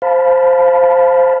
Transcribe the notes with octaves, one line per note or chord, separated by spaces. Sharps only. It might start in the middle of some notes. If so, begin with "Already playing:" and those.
C5 F5 A5 B5